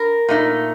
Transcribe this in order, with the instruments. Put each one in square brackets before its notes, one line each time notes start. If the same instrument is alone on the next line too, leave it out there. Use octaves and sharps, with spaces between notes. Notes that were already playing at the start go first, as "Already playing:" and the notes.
Already playing: [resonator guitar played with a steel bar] A#4
A#2 A3 D#4